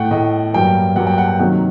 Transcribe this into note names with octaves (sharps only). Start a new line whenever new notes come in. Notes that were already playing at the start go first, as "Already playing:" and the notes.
Already playing: A2 A3 F#5 G5
A2 A3 D#5
G2 F#3 A#3 G5
G2 F#3 A#3 F#5
G5
F#5
G5
C3 D#3 F#3 A#3 F#5